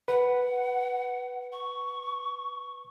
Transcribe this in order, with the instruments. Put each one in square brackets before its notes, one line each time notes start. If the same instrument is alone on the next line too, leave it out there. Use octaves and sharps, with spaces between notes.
[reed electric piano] B4 [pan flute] F#5
[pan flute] C#6